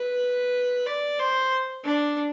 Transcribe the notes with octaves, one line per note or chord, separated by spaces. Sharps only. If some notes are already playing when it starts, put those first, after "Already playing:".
Already playing: B4
D5
C5
D4